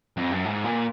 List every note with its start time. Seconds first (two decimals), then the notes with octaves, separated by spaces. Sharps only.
0.17 F2
0.31 F#2
0.45 G#2
0.65 A#2